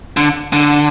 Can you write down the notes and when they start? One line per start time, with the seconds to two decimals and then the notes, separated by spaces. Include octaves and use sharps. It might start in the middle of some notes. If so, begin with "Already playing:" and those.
0.17 D3
0.53 D3